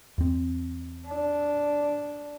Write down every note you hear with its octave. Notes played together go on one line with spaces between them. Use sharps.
E2 C4
D4